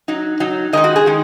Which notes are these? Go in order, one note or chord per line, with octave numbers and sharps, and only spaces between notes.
F#3 D#4
F#3 D#4
D#3 G#3 D#4 A#4 D#5
F#4
G#4
D#3 G#3 D#4